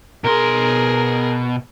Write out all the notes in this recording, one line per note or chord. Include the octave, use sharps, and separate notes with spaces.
B2 G#4 A#4 C6